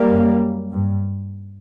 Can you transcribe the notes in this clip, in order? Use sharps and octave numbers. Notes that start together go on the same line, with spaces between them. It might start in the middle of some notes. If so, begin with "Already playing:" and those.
Already playing: G3 A#3
F#2
G2